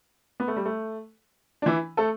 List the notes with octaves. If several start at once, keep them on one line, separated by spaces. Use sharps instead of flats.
B3
A3
G3
A3
D4
E3 E4
A3 A4